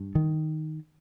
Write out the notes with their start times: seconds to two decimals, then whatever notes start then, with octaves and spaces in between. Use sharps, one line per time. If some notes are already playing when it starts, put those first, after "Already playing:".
Already playing: G2
0.15 D#3